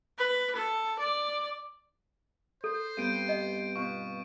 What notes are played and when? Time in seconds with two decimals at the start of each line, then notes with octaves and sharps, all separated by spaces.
0.18 B4
0.56 A4
0.99 D5
2.64 A4 C5
2.97 G2 B3 C4 G6 D7 D#7
3.29 D#5
3.76 B2 F4 C#6